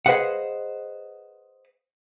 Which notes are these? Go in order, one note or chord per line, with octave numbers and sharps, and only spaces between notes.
G#4 B4 C5 D#5 F5 F#5